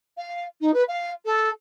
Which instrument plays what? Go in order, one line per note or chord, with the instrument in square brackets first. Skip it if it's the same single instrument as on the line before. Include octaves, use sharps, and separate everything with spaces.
[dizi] F5
D#4
B4
F5
A4